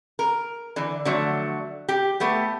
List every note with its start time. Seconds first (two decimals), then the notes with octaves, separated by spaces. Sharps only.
0.19 A#4
0.76 D3 E3
1.05 D3 F3 F#3 A3
1.89 G4
2.20 A3 B3 G4